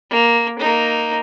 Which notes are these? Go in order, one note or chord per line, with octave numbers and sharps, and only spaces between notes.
A#3
A#3 D#4